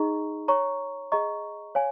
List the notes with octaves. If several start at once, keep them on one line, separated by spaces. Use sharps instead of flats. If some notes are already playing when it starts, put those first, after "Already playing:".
Already playing: D#4 G#4 D#5 A#5 C#6
C#5 A#5 C#6
G#4 D#5 A#5 C#6
C#5 F5 G#5